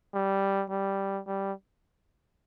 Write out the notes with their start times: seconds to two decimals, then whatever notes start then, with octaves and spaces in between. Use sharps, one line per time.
0.14 G3
0.70 G3
1.27 G3